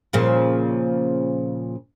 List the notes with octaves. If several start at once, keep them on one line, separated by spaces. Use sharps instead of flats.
A#2 C#3 F3